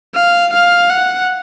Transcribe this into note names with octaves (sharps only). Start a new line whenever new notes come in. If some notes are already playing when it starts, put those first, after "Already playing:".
F5
F5
F#5